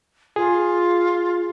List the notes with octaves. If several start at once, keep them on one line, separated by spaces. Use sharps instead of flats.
F4 G#4